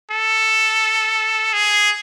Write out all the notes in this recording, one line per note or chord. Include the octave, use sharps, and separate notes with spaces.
A4
G#4